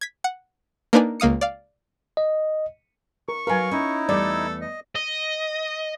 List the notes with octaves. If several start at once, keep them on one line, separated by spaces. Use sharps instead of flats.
G#6 B6
F#5
A#3 D4 D#4 B4 D5 G#5
C#2 A#3 F5 D#6 C#7
D5 F5
D#5
A#4 C#6
F#3 A#4 B4 F5 G#5
C#4 D#4 E4
E2 G3 A3 A4 D5
D#5
D#5